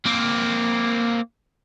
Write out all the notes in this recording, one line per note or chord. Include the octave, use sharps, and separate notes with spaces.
A#3 C4